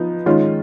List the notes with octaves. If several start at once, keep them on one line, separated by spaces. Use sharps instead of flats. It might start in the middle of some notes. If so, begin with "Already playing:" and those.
Already playing: F3 B3 D#4
D#3 G#3 C#4 F4